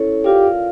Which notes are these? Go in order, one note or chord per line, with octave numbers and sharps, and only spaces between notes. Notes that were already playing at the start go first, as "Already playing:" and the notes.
Already playing: C#4 E4 A4 C#5
F4 G4 A#4 D5 F5